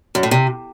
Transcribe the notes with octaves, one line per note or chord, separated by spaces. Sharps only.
F#2
A2
C3